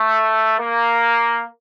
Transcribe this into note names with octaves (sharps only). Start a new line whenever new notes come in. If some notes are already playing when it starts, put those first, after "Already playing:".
Already playing: A3
A#3